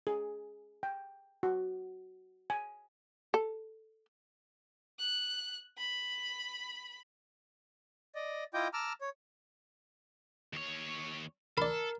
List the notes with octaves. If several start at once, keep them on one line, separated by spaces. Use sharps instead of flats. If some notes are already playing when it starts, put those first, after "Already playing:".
G#4
G5
F#4
G#5
A4
F#6
B5
D5 D#5
E4 F4 D#5 G5 D6 G6
A5 A#5 D6 E6 F6
C#5
D#2 C#5
A4 A#4 D5 B5